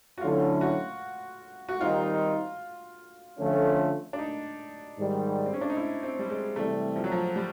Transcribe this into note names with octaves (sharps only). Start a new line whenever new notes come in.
F#4
D3 F#3 A3 C#4 E4 F4
F#4
F#4
D#3 G3 C4 D#4 F4
D3 F3 A3 C#4 F4
D4
D#4
G#2 D#3 G3
C4
C#4
D4
D#4
E4
C4
G3
G#3
C3 E3 G3 A3
F3
F#3
F3
G3